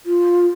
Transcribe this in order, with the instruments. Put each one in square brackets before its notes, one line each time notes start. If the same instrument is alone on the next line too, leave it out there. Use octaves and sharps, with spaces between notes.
[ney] F4